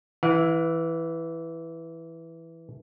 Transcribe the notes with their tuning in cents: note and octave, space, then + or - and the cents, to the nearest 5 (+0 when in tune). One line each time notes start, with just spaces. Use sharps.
E3 +0 F#5 -45